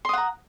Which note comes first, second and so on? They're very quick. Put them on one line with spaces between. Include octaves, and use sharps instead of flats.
C6 D#6 F#5 A#5